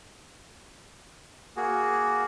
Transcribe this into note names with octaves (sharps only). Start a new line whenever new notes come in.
A#3 F#4 G#4